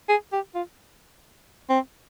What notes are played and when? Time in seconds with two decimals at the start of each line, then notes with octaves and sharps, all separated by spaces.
0.09 G#4
0.33 G4
0.55 F4
1.69 C4